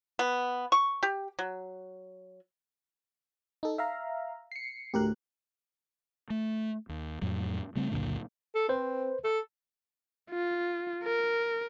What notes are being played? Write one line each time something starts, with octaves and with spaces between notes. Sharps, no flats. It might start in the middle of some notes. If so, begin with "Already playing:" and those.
B3
C#6
G4
F#3
D#4 A4
E5 F5 A#5
C7 C#7
D2 A2 G4 A#4 F#6
A3
D#2
F2 A2 F#3
C#3 G3 A3 C4
C#2 F#2 A#2 D3
A4
C4 B4 C5
A4
F4
A#4